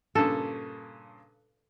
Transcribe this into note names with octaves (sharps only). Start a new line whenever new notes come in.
G2 A#2 C#3 A4